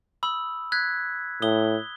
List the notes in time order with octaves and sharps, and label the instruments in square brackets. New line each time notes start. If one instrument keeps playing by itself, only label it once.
[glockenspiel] B5 D#6 E6
F#6 G#6 B6
[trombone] A2 [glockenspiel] D#6 G7